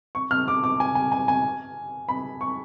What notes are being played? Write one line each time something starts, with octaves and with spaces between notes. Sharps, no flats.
C#6
F6
D6
D6
G#5
G#5
G#5
G#5
B5
C#6